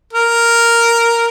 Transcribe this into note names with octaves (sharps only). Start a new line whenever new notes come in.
A#4